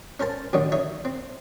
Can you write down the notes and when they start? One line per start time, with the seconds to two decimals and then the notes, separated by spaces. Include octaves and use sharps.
0.20 C#4 A#4 C5 A5
0.53 A1 F#2 D3 D#3 C#4 D#4
0.72 D#4 C#5 E5
1.05 C4